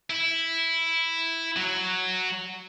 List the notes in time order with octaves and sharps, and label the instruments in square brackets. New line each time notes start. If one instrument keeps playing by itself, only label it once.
[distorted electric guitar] E4
F#3